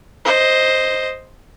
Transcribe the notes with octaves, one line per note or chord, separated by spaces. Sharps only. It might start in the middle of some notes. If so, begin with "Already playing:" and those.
C5 D#5